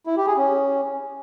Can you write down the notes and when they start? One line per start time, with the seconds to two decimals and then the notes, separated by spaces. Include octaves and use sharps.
0.07 E4
0.17 G4
0.27 G#4
0.37 C#4